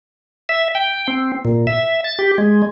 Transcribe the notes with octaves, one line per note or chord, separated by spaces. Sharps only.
E5
G5
C4
A#2
E5
A6
G4
G#3